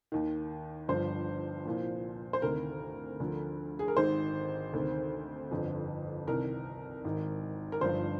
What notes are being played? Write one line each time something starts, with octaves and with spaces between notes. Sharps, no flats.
D#2 D#3
G1 G2 F3 C5
C2 A#2 F3
C5
D2 C3 D#3 A#4
D2 D3 F3
G#4
A#4
G#1 G#2 D#3 C5
D2 C3 D#3
G1 F2 D3
C2 C3 D#3 A#4
G#1 G#2 D#3
A#4
G1 G2 F3 C5